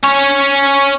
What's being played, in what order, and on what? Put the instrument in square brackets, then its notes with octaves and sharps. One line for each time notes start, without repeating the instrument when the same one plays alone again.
[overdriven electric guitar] C#4 C#5